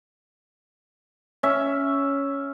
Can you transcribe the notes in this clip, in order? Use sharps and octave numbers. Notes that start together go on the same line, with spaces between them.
C#4 E5